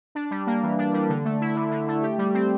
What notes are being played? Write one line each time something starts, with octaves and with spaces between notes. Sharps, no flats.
D4
G3
A#3
E3
D4
G3
D3
A3
E4
D3
D3
A3
G4
G3
C4